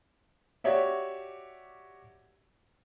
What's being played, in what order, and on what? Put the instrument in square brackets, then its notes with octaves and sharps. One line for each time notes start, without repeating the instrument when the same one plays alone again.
[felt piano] F#4 G4 C#5 D5 E5